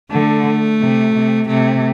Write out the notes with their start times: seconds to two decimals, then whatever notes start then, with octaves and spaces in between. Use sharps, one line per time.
0.11 D3 A3
0.80 C3
1.14 C3
1.48 C3 A3